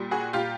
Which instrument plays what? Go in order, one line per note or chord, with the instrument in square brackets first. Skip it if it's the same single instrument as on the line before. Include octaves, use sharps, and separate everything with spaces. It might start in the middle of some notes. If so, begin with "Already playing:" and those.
Already playing: [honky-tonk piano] A#2 G3
F#4 G#4
A#2 F4 G4